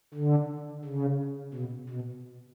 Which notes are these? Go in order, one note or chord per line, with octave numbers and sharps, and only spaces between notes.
D3
C#3
B2
B2